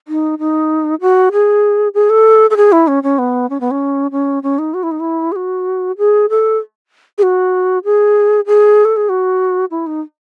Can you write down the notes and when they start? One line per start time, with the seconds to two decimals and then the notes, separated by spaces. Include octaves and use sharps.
0.08 D#4
0.39 D#4
1.01 F#4
1.32 G#4
1.94 G#4
2.10 A4
2.50 A4
2.57 G#4
2.72 E4
2.88 C#4
3.03 C#4
3.19 B3
3.50 C#4
3.60 B3
3.71 C#4
4.11 C#4
4.43 C#4
4.59 D#4
4.74 F#4
4.83 E4
4.91 D#4
5.00 E4
5.32 G#4
5.36 F#4
5.98 G#4
6.30 A4
7.18 G#4
7.23 F#4
7.85 G#4
8.47 G#4
8.85 A4
8.97 G#4
9.09 F#4
9.71 E4
9.87 D#4